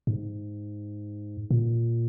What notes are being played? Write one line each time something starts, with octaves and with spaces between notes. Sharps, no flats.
G#2
A#2